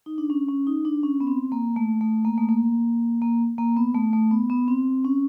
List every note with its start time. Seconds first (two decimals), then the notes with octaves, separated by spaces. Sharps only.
0.06 D#4
0.18 D4
0.30 C#4
0.49 C#4
0.67 D#4
0.85 D4
1.03 C#4
1.21 B3
1.27 C4
1.52 A#3
1.76 A3
2.01 A3
2.25 A#3
2.38 A3
2.49 A#3
3.22 A#3
3.58 A#3
3.77 B3
3.95 A3
4.13 A3
4.31 B3
4.50 B3
4.68 C4
5.05 C#4